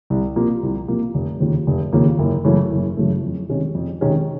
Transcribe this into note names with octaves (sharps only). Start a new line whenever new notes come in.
C2
C3 F3 A#3
C2
C3 F3 A#3
F1
D#2 C#3 F3 A#3
F1
D#2 C#3 F3 A#3
F#1
F#2 C#3 E3 A3
F#1
F#2 C#3 E3 A3
F2
C3 D#3 G#3 C#4
F2
C3 D#3 G#3 C#4